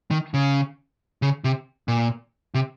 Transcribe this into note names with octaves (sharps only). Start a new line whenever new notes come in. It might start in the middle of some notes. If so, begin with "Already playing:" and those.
D#3
C#3
C#3
C3
A#2
C3